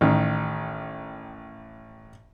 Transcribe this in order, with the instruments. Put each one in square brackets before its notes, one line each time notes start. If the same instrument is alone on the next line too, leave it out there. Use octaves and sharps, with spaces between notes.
[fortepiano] A1 D#3